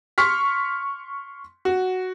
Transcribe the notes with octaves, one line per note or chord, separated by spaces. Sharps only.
C6 C#6 F6 B6
F#4